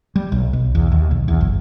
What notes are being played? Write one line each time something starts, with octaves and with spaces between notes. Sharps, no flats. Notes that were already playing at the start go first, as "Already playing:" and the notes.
G3
B1
B1
E2
D#2
B1
E2
F#1